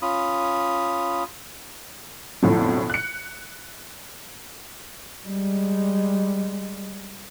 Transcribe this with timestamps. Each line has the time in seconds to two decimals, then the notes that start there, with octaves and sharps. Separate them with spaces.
0.02 C#4 F4 B5 D#6
2.43 B1 F2 A2 D3 F3 F#3
2.90 F#6 C#7
5.26 G3 G#3